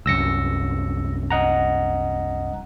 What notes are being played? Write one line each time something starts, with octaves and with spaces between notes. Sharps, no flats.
C2 F#2 E6 A#6 C#7
D#5 F#5 A#5